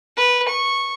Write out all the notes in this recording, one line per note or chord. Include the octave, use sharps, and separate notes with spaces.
B4
C#6